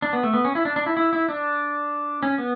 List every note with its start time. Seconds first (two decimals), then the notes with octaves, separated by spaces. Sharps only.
0.02 D4
0.13 B3
0.23 A3
0.34 B3
0.45 C#4
0.55 E4
0.65 D4
0.76 D4
0.86 E4
0.97 E4
1.13 E4
1.29 D4
2.23 C#4
2.38 B3